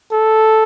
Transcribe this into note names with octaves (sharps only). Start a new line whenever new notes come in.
A4